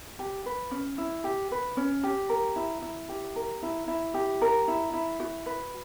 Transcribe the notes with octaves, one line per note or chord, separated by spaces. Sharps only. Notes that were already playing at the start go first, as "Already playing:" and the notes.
G4
B4
C#4
E4
G4
B4
C#4
G4
A#4
E4
E4
G4
A#4
E4
E4
G4
A#4
E4
E4
F#4
B4